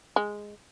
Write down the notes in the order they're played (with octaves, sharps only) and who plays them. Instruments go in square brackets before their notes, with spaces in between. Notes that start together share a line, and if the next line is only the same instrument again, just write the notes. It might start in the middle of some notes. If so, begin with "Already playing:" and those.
[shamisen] G#3